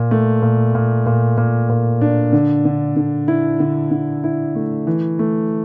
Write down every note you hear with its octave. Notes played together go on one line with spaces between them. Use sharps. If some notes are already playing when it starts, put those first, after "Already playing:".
Already playing: A#2
A3
A#2
A#2
A#2
A#2
A#2
D4
D3
D3
D3
E4
D3
D3
E4
A3
E3
A3